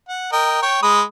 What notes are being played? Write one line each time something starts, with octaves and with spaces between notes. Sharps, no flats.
F#5
A#4 D#5 G5
C#5 G5
G#3 B5 D#6